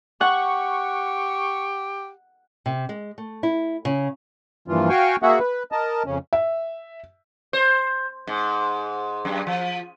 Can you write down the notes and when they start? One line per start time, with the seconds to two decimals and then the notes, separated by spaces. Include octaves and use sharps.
0.21 G4 F#5 C#6
2.66 C3
2.89 G#3
3.18 A3
3.43 E4
3.85 C#3
4.68 G2 A#2 E3 F3 F4
4.89 F#4 F5 G5 G#5 C#6
5.23 A#3 F#4 G#4 E5 F#5
5.39 B4
5.72 A#4 D#5 A5
6.06 F2 C#3 C#4
6.33 E5
7.53 C5
8.27 G#2
9.25 F#2
9.47 F3